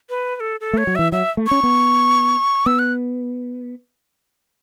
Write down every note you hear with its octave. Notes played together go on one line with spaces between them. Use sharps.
B4
B4
A4
A4
A3
C#5
F#3
E3 E5
F#3 E5
A3
C#4 C#6
B3
B3 E6
F#6